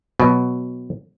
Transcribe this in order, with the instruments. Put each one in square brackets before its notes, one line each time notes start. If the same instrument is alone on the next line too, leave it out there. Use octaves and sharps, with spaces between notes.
[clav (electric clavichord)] B2 F#3